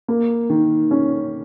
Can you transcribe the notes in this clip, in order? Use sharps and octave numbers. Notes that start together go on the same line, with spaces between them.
A#3
D#3
C#4